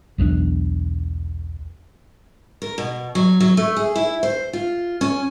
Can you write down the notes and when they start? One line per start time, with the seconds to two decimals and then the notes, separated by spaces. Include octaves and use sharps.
0.18 B1 E2 F3 D4
2.62 A#4
2.78 B2
3.15 F#3
3.40 F#3
3.57 A3
3.77 G#4
3.96 E4
4.23 C5
4.53 F4
5.01 C#4